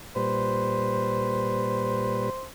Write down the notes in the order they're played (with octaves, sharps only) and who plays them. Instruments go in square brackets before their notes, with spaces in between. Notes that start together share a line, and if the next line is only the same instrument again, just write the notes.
[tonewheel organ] A#2 G3 B4 [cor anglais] C5